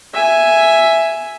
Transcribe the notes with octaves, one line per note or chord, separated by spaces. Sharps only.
E5 G#5